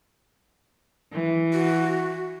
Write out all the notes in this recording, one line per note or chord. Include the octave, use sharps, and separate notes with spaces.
E3
F#4